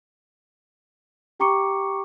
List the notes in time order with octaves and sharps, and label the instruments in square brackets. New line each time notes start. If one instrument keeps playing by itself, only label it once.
[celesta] G4 G5 A#5 C#6 D6 C#7